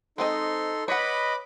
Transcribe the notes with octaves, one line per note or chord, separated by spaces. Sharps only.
G#3 C4 D#4 A4 D#5 C6
B4 C#5 D#5 F#5 B5 D6